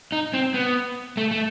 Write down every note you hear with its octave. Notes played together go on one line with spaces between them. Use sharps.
D#4
C4
B3
A3
A3